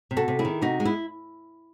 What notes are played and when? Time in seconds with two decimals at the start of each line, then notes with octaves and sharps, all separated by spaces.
0.11 C3
0.17 F#4 A4
0.28 C3
0.39 E4 G#4
0.45 D#3
0.62 C3 D#4 F#4
0.80 G#3
0.85 E4